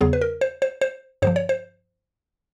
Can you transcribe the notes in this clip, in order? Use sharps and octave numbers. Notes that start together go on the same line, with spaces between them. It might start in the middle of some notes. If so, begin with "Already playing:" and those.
E2 C#3 F#3 B3 G#4
B4
A#4
C5
C5
C5
G2 D3 F3 C5
C#5
C5